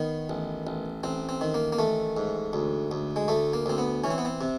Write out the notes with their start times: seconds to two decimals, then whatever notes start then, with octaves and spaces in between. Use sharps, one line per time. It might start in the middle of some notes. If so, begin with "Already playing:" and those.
Already playing: D#3 B3
0.30 A1
0.67 A1
1.04 A1 C4
1.29 C4
1.41 D#3
1.54 A#3
1.73 A#3
1.79 A1 A3
2.17 G#2
2.53 D2
2.91 D2
3.16 G#3
3.28 D2 A3
3.53 A#3
3.66 D2 C4
3.78 B3
4.04 E3 C#4
4.10 C4
4.18 B3
4.25 C4
4.41 C3